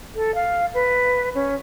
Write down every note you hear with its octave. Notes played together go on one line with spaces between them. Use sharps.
A4
F5
B4
C#4